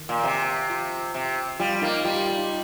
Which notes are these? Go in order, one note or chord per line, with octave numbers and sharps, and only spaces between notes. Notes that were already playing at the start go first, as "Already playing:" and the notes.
Already playing: D#3
A#2
C3
F4
C3
G3 F4
A#3 D#4
G3 F4
G4
F4
D#4